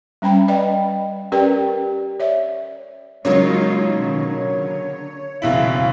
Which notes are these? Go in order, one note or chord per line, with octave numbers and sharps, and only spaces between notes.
G3 C#4 G5 B5
B4 D5 D#5 F5 G5
C#4 G4 A#4 B4 D5 G5
C#5 D5 E5
C#3 F#3 G#3 A#3 D#4 F4 C#5
B2 D#3
D3
F#1 B2 E3 C4 E4 F5